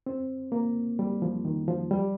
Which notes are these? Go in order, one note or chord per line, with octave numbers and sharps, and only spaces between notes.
C4
A#3
G3
F3
D#3
F3
G3